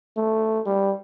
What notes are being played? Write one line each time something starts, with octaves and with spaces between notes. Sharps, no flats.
A3
G3